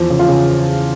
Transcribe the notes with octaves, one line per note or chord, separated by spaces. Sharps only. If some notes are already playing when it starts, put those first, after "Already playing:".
Already playing: E2 F3
C#3
F4
C#3